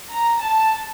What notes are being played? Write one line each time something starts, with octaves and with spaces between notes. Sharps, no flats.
A#5
A5